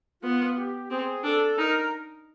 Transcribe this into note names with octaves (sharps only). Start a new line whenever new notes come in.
B3 F4
G4
C4 G#4
D4 A4
D#4 A#4